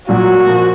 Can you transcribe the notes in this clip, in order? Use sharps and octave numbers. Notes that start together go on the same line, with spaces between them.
A#1 A#2 F#3 A#3 F#4
A#2 F3 A#3